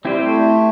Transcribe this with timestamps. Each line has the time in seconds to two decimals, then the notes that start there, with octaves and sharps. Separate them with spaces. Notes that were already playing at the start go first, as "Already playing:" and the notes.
0.04 G3 C4 E4 G4 C5
0.22 A3